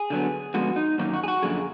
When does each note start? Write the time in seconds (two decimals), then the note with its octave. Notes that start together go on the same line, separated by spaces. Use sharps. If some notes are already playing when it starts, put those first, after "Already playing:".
Already playing: G#4
0.10 D3 F#3 B3
0.54 D3 F3 G#3 B3 F#4
0.76 D#4
0.98 F#2 D#3 F#3 A#3 D#4
1.13 F#4
1.23 G#4
1.28 F#4
1.42 F#2 D3 F3 A#3 G#4